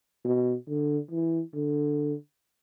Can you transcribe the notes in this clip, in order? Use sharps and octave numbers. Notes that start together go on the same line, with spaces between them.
B2
D3
E3
D3